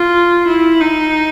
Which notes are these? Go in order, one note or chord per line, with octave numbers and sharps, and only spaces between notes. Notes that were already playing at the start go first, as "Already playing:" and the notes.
Already playing: F4
E4
D#4